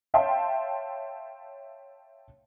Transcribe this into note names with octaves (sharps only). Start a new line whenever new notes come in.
C#5 E5 F5 G5 A5 C6